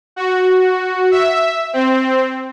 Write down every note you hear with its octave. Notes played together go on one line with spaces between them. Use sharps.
F#4
E5
C4